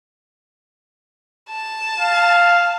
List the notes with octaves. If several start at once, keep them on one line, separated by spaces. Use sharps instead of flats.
A5
F5